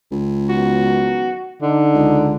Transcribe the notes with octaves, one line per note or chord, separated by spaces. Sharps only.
C#2
D#3 F#3 B3 F#4
D3 D#4
C#2